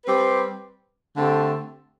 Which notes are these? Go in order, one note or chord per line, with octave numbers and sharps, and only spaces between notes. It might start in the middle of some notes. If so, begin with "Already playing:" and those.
G3 C4 G4 B4
D3 A3 C4 G4